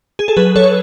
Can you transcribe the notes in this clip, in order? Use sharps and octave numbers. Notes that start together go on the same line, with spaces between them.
G#4
A4
F#3 G#4 B4
F#3 A4 C#5